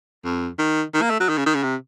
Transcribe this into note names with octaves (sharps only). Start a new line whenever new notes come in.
F2
D#3
D#3
A#3
A3
F#3
D#3
C#3
D#3
C#3
C3